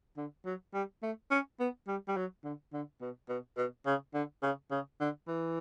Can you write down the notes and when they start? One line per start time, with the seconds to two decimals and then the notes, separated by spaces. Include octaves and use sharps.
0.17 D3
0.45 F#3
0.74 G3
1.03 A3
1.31 C#4
1.60 B3
1.88 G3
2.08 G3
2.17 F#3
2.44 D3
2.73 D3
3.01 B2
3.29 B2
3.57 B2
3.86 C#3
4.14 D3
4.43 C#3
4.71 C#3
5.00 D3
5.27 E3